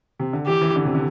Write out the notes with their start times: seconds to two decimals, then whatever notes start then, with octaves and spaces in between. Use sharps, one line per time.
0.20 C3
0.33 D3
0.47 E3 G4
0.61 E3
0.76 D3
0.85 C3
0.95 D3